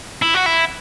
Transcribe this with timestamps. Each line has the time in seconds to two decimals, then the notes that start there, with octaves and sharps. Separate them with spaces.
0.22 E4
0.34 F#4
0.46 E4